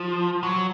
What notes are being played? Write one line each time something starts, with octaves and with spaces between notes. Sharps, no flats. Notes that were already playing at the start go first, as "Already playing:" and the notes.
Already playing: F3
F#3